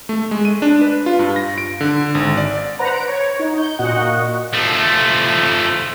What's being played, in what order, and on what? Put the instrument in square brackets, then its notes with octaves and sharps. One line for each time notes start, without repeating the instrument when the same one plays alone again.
[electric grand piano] A3
G#3
D#7
D4
B4
F4
G2
A#6
D7
D3
G#1
D5
[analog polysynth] B4 C5 F#5 A#5
D7
C#5
D#4
G6
A#2 F#4 D#5 F#5
[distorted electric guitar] F3 A3